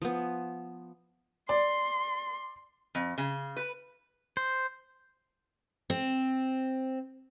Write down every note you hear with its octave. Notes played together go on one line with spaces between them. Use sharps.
F3 B3
D5 C6
F2
C#3
B4
C5
C4